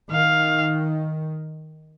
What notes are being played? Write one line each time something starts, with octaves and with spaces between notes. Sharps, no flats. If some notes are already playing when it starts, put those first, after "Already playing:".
D#3 F5